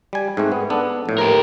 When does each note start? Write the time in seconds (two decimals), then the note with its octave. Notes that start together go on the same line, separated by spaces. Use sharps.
0.13 G3 G#5
0.37 G#2 A3 C4
0.52 B3
0.70 B3 D4 A4
1.06 A#1 A2
1.18 G4 A#4